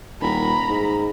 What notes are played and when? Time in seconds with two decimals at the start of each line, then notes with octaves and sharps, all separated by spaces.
0.21 D#1 A#5 B5
0.69 G#2